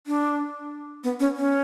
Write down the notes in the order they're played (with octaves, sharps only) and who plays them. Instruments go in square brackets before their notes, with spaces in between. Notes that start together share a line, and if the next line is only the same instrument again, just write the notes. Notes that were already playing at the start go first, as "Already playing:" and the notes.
[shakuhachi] D4
B3
C#4
C#4